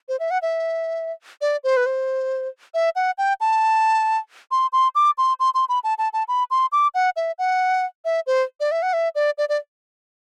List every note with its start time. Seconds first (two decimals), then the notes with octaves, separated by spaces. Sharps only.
0.09 C5
0.20 E5
0.31 F#5
0.42 E5
1.41 D5
1.64 C5
1.77 B4
1.86 C5
2.74 E5
2.96 F#5
3.18 G5
3.41 A5
4.51 C6
4.73 C6
4.95 D6
5.18 C6
5.40 C6
5.54 C6
5.69 B5
5.84 A5
5.98 A5
6.13 A5
6.28 B5
6.51 C6
6.72 D6
6.94 F#5
7.16 E5
7.39 F#5
8.05 E5
8.27 C5
8.60 D5
8.72 E5
8.82 F#5
8.93 E5
9.15 D5
9.38 D5
9.49 D5